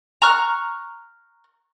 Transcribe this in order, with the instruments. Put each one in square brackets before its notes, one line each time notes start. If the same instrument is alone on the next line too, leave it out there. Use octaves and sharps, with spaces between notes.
[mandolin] A#5 C#6 F6 F#6